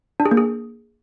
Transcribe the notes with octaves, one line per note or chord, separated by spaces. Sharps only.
D4
G#4
A#3
G#4